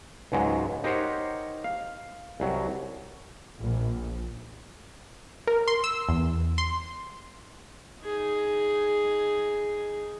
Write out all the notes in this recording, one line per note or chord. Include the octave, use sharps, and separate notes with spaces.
C#2 G#2 F#3 G#3
D#4 G4 A#4 C5 C#5 F#5
F5
C2 F#3
A#1
A#4
C6
E6
E2
C6
D#4 G#4